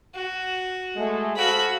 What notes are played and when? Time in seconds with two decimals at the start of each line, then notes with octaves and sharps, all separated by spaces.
0.15 F#4
0.96 G#3 A3
1.36 F#4 A4 C5 F5 B5